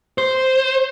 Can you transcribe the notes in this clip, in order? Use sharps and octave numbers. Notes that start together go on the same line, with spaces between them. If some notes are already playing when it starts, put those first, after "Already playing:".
C5